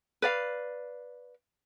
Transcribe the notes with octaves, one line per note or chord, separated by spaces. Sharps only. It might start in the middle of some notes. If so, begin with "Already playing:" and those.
B4 D5 F5